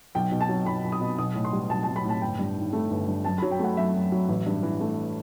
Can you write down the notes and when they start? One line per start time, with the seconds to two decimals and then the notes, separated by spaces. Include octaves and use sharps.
0.15 B1 G5
0.31 B2
0.41 A5
0.49 F#3
0.66 B1 B5
0.84 B1
0.92 D#6
1.01 B2
1.18 B1 D#6
1.35 A2
1.45 C6
1.53 G3
1.69 B1 A5
1.83 B1 A5
1.96 B5
2.04 A2
2.09 A5
2.22 G1 G5
2.39 G2
2.56 D#3
2.73 A3
2.90 G1
3.08 G2
3.25 F#2 A5
3.38 F#3 B5
3.51 G5
3.59 A3 F#5
3.77 F#2 E5
3.94 F#2
4.12 F#3
4.28 A1
4.46 G2
4.63 E3
4.81 A3